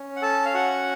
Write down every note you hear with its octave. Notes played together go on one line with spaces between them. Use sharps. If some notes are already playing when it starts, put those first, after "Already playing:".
Already playing: C#4
F#5
A4 A5
F5
F#4 F#5